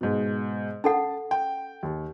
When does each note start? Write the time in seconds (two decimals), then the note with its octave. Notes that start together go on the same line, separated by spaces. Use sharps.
0.01 G#2 B2
0.84 C#4 A4 F#5 A5
1.31 G5
1.83 D#2